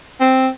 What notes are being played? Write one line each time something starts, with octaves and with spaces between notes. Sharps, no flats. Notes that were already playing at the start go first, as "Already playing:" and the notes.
C4